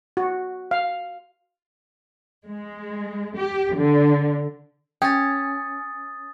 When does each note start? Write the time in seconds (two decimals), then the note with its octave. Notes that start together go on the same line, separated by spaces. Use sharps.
0.17 F#4
0.71 F5
2.46 G#3
3.37 G4
3.76 D3
5.02 C#4 G5 D#6 A6